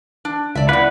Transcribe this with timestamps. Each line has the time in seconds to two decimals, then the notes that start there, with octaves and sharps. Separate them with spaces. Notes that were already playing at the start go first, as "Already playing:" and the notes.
0.25 D4
0.55 C#2 D5 E5
0.69 A#3 B3 E4 B4 D5 F#5